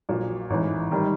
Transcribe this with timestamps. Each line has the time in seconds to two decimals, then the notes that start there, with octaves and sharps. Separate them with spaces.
0.09 A#1 A#2 F#3
0.50 A1 G#2 E3
0.91 D#3 G3